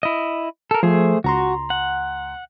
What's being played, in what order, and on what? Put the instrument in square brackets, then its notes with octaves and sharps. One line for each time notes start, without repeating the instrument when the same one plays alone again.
[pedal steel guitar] E4 D#5
A4 A#4
[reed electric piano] F3 [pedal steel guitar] A3 G#4 C5
[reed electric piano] C#2 A#5 C6 [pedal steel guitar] F#4
[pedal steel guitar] F#5